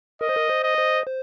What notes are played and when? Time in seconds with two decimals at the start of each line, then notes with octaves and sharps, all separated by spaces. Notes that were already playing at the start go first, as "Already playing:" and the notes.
0.21 A#4 D#5
0.29 C5
0.36 A#4
0.49 C5
0.64 D#5
0.78 C5
1.06 C5